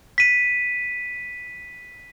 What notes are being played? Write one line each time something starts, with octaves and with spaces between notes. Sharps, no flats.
B6 D#7